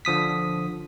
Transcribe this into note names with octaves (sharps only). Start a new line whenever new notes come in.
D3 F3 D#6 B6